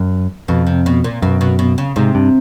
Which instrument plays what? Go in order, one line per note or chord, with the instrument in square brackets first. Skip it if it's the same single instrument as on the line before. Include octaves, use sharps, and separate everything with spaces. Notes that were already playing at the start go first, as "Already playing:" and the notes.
Already playing: [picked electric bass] F#2
[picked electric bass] F2 [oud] B2
[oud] C3
B2
A#2
[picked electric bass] F#2 [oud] B2
[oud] B2
B2
C#3
[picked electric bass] G#2 [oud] C3
[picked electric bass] G2